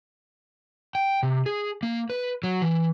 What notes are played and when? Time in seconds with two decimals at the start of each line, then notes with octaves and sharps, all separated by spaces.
0.95 G5
1.23 C3
1.46 G#4
1.83 A#3
2.10 B4
2.43 F#3
2.62 E3